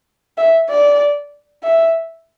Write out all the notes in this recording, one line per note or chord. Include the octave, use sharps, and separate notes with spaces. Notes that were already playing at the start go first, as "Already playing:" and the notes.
E5
D5
E5